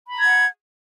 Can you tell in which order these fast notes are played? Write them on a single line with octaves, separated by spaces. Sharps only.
B5 A#5 G#6 F#5